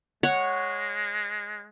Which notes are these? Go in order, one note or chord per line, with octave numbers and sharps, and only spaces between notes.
G#3 C#5 F#5